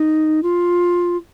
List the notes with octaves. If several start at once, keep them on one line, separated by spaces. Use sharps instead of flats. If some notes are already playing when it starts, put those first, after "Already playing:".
Already playing: D#4
F4